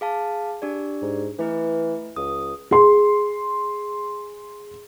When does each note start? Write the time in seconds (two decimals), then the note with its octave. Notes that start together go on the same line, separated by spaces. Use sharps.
0.01 G#4 F5 A5
0.62 D4 G4 D5
1.02 G#2
1.39 E3 A3 E4 B4
2.16 C#2 D#6
2.71 G#4 C6